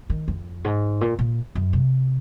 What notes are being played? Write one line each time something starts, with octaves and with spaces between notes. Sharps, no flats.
D#3
F2
G#2
A#2
A#2
F#2
C3